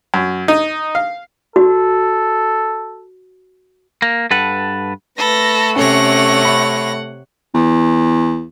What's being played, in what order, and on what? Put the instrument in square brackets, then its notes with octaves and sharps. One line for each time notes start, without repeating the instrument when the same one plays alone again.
[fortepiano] F#2
D#4
F5
[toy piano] F#4 [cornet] A4
[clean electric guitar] A#3
G2 A4 B4 F#5
[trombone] A3 [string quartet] A4 B5 [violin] B4 A#6
[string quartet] C3 C#5 A#6 [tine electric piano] C#4 A4 [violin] F#5
[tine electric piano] B5
[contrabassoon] E2